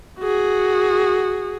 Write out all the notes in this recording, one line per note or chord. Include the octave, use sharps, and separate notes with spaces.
F#4 G#4